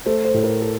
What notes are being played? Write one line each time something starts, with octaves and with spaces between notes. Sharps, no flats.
A3 C5
C5
A2
A#4
A4